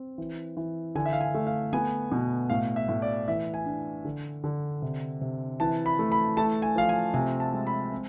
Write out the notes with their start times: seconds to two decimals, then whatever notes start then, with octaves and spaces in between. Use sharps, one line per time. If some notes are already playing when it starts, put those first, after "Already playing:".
Already playing: C4
0.18 E3
0.57 E3
0.95 D3 G#5
1.06 E5
1.13 F5
1.21 G#5
1.35 A3
1.47 F5
1.73 B3 G#5
2.12 B2
2.50 A2 F5
2.76 E5
2.89 A2
3.02 D5
3.28 E3 E5
3.54 G#5
3.66 D4
4.05 D3
4.44 D3
4.82 C3
5.21 C3
5.60 E3 A5
5.86 B5
5.99 A3
6.12 B5
6.37 A3 A5
6.62 G#5
6.76 F3 F5
6.89 G#5
7.14 C3 G#5
7.40 A5
7.53 G#3
7.67 B5
7.92 C4